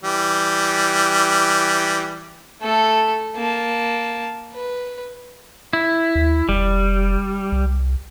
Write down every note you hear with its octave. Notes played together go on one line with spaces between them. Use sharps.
E3 G3
A3 A4
A#3 A5
B4
E4
D#2
F1 G3
C2